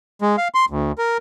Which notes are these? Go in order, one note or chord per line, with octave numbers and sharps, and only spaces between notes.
G#3
F5
C6
D2
A#4